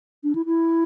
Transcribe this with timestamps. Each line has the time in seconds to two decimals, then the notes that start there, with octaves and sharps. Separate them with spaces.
0.24 D4
0.35 E4
0.46 E4